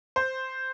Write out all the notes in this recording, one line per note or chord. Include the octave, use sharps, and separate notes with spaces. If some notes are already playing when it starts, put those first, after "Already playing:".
C5